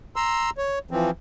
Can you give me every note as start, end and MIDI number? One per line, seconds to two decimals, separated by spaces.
0.16 0.50 82
0.16 0.50 84
0.16 0.50 88
0.58 0.79 73
0.91 1.10 52
0.91 1.10 53
0.91 1.10 60